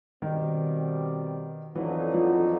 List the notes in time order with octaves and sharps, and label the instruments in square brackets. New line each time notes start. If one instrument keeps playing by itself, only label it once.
[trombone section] B2 G3 C4 [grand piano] D#3
[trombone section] F2 D3 F#3 B3 D#4 [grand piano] E3
[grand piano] F3